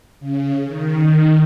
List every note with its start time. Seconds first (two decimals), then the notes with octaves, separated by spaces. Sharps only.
0.20 C#3
0.65 D#3